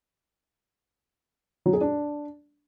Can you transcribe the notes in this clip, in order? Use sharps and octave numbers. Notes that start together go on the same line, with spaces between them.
F#3
G#4
D4